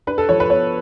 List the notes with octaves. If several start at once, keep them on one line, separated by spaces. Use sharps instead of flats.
D4 B4
A4
F3 C#5
B4
B3 C#5